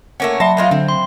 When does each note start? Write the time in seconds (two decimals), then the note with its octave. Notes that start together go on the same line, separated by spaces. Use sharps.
0.20 A3 A#3 C#4 F#5
0.40 F#3 E5 A5 B5 C6 A#6
0.57 F3 G#3 F4
0.71 D3 C4
0.89 C6